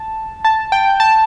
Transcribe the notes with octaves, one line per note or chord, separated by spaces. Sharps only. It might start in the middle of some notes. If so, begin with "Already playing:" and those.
Already playing: A5
A5
G5
A5